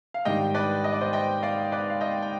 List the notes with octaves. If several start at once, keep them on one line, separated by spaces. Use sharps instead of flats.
F5
G#2 D#3 G3 D4 D#5 G5
B4 D5
D#5
D5
C5 D#5
D#5 G5
D5 F5
B4 D5
F5
D#5 G5
G5